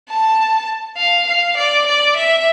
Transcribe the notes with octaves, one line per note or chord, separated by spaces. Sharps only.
A5
F5
F5
D5
D5
E5